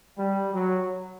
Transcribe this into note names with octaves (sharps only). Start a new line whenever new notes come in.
G3
F#3